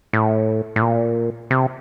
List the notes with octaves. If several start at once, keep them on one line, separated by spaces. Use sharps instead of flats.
A2
A2
A#2
C3